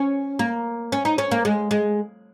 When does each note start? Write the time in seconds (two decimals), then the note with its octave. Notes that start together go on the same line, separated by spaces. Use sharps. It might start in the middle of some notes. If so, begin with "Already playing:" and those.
Already playing: C#4
0.39 A#3
0.92 C#4
1.05 D#4
1.18 C#4
1.31 A#3
1.45 G#3
1.71 G#3